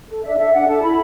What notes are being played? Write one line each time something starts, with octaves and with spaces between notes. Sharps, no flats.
A4
D4 E5
A4 E5
D4 F#5
A4 A5
E4 B5